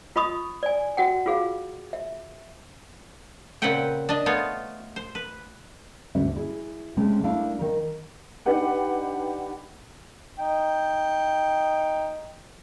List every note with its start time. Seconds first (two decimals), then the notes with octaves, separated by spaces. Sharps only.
0.16 F4 D#5 B5 C#6 D#6
0.63 D5 G#5
0.97 F#4 F#5 G5
1.26 F4 F#4 G#4 F5
1.93 E5
3.62 A#2 C#3 C4 B4 F#5 G5
4.09 D4 D#5
4.26 A3 B3 F4 C#5
4.96 C5
5.15 B4
6.15 D2 G#2 D3 C#4 E5
6.36 E4 G#4
6.97 C3 G#3 A3 C#4 A5
7.24 A3 D4 E4 A#4 F5
7.59 D#3 A#4
8.46 D4 D#4 G4 B4 F#5 G5
10.39 D#4 G5